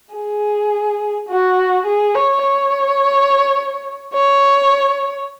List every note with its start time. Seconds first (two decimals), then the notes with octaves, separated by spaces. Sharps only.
0.15 G#4
1.28 F#4
1.86 G#4
2.14 C#5
2.43 C#5
4.14 C#5